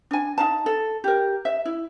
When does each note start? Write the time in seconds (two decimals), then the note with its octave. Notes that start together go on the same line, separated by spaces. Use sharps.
0.11 D4 G#5
0.38 D#4 F5 A5
0.66 A4
1.04 G4 A#4
1.45 E5
1.65 E4